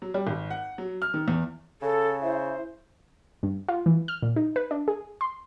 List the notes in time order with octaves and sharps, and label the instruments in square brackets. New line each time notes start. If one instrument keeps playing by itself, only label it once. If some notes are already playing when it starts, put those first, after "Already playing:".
[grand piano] F#3
G3
G#1
F#5
F#3
F6
D#3
E2
[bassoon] C#3 [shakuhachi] A4
[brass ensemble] E4 E5 [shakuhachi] C5
[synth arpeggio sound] G2
F4
E3
F6
A#2
D#4
B4
D4
G#4
C6